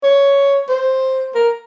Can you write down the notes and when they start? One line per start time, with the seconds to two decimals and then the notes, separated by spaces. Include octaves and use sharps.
0.03 C#5
0.69 C5
1.35 A#4